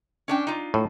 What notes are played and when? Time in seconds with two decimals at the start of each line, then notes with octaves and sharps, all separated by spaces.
0.28 C#4 D4 G5
0.47 D#4 F4
0.74 A2